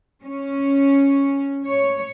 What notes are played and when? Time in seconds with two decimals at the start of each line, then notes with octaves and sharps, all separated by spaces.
0.24 C#4
1.66 C#5